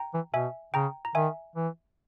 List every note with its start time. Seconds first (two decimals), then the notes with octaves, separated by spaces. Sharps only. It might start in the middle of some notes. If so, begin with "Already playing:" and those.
Already playing: G5 A#5
0.14 E3
0.34 B2 E5 G#5
0.74 C#3 G5 A#5
1.05 A#5
1.15 D#3 E5 G#5
1.56 E3